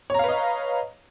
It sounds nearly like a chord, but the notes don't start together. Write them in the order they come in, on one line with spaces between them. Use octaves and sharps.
C#5 A#5 F5 B4 D#5